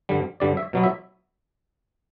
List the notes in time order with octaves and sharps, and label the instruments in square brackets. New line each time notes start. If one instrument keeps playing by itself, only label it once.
[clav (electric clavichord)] G2 D3 G3
G2 D3 G3 D5
E5
B2 F#3 B3
E5